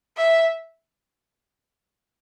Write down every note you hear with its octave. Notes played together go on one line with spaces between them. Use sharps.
E5